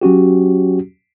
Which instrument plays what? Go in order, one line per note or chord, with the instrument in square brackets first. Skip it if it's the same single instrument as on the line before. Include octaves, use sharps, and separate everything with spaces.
[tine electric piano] F#3 C#4 F#4 G4